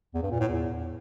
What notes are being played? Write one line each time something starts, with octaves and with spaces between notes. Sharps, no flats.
E2
G2
A#2
A2
E2